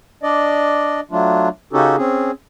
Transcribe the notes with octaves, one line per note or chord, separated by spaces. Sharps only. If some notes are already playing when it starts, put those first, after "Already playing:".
D4 D5 D#5
F#3 A3 D4 F4
C#3 C#4 D#4 F#4 G4 A4
C4 C#4 G#4